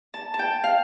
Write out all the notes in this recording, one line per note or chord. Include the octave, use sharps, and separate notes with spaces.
A5
A5
G5
F5